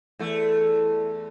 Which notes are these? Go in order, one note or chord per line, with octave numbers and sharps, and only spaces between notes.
E2 A3